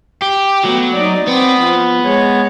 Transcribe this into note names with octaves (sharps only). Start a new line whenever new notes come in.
G4
F#3 A3 B3
D#4 D5
B3 C4
F3
G#3 C#5